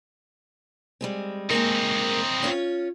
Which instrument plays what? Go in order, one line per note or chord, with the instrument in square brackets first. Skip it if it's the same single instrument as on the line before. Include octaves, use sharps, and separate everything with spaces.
[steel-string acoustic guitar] G3 G#3 C4
[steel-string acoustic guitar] G#3 A#3 A#4 [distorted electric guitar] C4 D#4
[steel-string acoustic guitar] C#4 F4 C#5